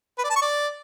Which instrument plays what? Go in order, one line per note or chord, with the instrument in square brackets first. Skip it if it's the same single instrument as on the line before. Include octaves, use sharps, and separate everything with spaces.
[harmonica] B4
D5
A5
C#6
D5